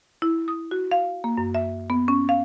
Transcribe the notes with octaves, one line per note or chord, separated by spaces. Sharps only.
E4
D#6
F#4
F5
A#3
F#2
E5
B3
C#4
F5